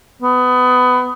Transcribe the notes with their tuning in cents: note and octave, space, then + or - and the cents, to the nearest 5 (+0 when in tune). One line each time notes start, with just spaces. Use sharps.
B3 +20